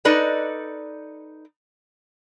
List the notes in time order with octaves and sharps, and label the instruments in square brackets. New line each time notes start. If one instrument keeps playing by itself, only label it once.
[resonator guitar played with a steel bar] D#4 A4 B4 D5 D#5